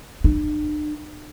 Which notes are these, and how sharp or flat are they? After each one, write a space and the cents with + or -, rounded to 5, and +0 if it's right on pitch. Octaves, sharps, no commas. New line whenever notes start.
D4 +45